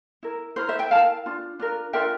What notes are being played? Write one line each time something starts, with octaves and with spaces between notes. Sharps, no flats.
E4 A#4
E4 A#4 C5
C5 E5
E5 G5
E4 A#4 F5 A5
D4 F4
D4 F4 A#4
D4 F4 A#4 E5 G5